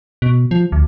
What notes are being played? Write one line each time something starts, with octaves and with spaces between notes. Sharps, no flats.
B2
F3
D2